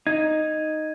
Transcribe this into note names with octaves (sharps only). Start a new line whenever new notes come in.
D#4 G#6